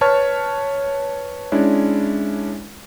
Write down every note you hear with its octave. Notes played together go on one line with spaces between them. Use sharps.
B4 C#5 A5 C#6 F6
G#3 C#4 D4 E4